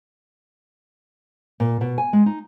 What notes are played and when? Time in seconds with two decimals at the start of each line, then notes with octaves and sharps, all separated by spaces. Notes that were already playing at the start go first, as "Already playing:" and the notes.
1.60 A#2
1.81 B2
1.98 G#5
2.13 G#3
2.26 D#4